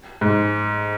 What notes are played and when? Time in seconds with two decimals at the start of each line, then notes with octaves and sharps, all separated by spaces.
0.21 G#2